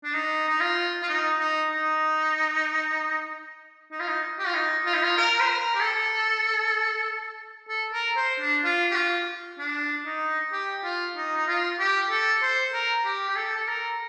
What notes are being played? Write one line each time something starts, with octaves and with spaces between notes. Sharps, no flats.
D4
D#4
D#4
F4
F4
D#4
D#4
D#4
D#4
F4
D#4
G4
F4
D#4
F4
D#4
F4
A#4
C5
A#4
G4
A4
A4
A#4
C5
D4
F4
G4
F4
D4
D#4
G4
F4
D#4
D#4
F4
G4
A4
C5
A#4
G4
G4
A4
A4
A#4